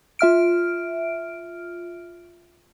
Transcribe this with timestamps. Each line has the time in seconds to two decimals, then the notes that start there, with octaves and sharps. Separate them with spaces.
0.19 F4 E5 F6 D7